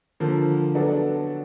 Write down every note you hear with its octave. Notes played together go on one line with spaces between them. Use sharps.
D3 F3 A#3
F#3 B3 D4 F#4 A4